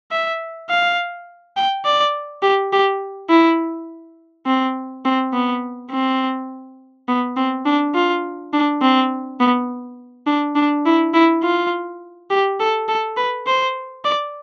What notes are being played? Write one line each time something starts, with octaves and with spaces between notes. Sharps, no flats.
E5
F5
G5
D5
G4
G4
E4
C4
C4
B3
C4
B3
C4
D4
F4
D4
C4
B3
D4
D4
E4
E4
F4
G4
A4
A4
B4
C5
D5